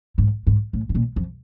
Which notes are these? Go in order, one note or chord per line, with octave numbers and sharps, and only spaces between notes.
G#2
G#2
A2
B2
A#2
F2